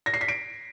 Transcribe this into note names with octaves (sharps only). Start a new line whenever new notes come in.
A#6
C7
B6
D7